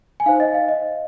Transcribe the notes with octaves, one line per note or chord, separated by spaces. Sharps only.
G#5
D#4 C5 F5
D#5
F5
D#5